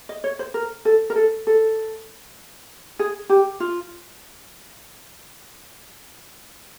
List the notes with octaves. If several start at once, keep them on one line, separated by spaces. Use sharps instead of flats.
D#5
C#5
C5
A#4
A4
A#4
A4
A4
G#4
G4
F4